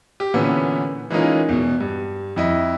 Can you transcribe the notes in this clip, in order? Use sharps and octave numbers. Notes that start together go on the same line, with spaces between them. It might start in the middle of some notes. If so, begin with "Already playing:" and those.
G4
A#2 D3 E3 B3 C#4
E3 G#3 A#3 C#4 D#4 F4
E2 B2
G2
F2 E4 D#5